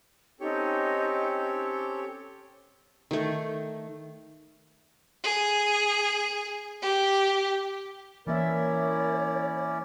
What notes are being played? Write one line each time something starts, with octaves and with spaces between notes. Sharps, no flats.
C4 C#4 D#4 G4 A4 C#5
D#3 A3
G#4
G4
E3 A#3 C#4 E4 A#4 C#5 D5 E5